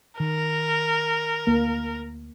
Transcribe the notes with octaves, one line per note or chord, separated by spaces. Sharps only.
D#3 A#4
D2 A#3